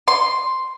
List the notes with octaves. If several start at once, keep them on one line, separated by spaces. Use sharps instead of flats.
C6